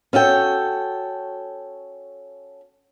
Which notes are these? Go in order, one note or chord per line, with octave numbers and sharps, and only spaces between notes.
C#4 F#4 A4 G5